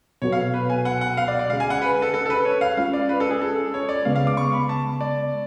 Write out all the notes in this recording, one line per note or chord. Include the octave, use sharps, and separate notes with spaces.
B2 F#3 B3 F#4 A4 C#5
F5
B4
G#5
F#5
F#5
F5
D5
D5
D3 G#3 C#4 G#4 F5
G#5
F#5
B4
A4
A4
A4
B4
C#5
F5
G#3 C#4 F4 F5
D5
B4
A4
G#4
A4
C#5
D5
C#3 G#3 B3 F5
F5
D6
C#6
B5
A5
D5